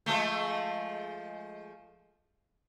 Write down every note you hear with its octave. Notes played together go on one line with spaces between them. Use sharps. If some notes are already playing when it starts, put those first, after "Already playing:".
F3 G#3 A3